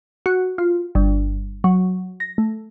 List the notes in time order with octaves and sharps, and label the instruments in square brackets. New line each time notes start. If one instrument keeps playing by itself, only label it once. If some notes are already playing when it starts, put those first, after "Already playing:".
[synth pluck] F#4
F4
G1
F#3
A#6
A3